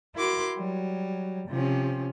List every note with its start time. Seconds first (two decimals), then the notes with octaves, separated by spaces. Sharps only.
0.16 E4 F#4 A#4 C6 D6
0.56 F#3 G3
1.49 C3 F3 C#4